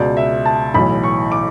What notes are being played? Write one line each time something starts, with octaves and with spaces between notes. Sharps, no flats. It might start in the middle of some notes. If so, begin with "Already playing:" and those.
Already playing: C#2 B2 D5
E5
A5
B1 A2 E3 B5
C#6
D6